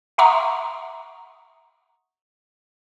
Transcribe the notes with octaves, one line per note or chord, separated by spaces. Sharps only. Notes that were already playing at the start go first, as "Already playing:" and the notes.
E5 F#5 A#5 C6 C#6 D#6